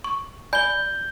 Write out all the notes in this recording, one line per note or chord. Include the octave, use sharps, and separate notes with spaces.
C#6
D5 G#5 B5 G6 G7